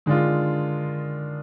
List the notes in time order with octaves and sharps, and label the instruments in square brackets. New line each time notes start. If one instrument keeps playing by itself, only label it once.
[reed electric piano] D3 [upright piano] D#3 G#3 D4 F4